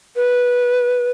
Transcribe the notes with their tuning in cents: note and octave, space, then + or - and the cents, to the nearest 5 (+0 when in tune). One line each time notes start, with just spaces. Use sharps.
B4 -10